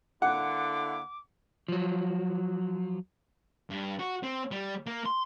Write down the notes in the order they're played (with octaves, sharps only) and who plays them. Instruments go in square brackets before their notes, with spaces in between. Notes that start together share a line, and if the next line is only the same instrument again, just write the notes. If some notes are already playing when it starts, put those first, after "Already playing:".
[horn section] D3 A#3 E4 [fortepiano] F#5 [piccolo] D6
[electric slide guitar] F3 F#3
[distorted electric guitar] G2
F#4
C4
G3
A#3
C6